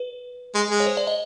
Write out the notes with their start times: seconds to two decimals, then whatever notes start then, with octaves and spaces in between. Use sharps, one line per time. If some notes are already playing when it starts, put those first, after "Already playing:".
Already playing: B4
0.55 G#3
0.70 G#3
0.80 C#5
0.87 C5
0.97 D5
1.07 D#5